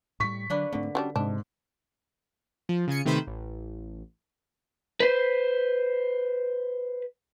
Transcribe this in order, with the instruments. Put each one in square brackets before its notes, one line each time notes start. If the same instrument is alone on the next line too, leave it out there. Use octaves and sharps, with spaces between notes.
[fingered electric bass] A2 G3 [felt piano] C#6 B6
[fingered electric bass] D3 F#3 [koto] A#3 D4 B4
[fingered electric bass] G#2 A3 C4 [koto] D3
[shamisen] F#3 G3 D4 [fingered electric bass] C#4
[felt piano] G#2 [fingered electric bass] C3 [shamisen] D4
[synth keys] F3
C#3 F4 G#5 C#7
C3 D#3 A3 B4 C5 B6
A1
[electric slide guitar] B4 C5